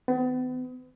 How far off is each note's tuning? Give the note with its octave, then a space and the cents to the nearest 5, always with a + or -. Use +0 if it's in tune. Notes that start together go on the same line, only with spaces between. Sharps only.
D#3 +15 B3 +40